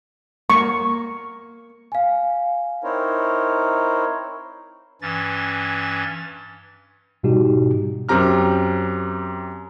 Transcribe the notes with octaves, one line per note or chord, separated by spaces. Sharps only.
A#3 C#6
F5 G#5
C4 D#4 E4 A#4 C5 C#5
G2 E3 C#4 A6
G#2 B2 G3 D#4 F#4 G4
F#2 C4 G4 A#5 F6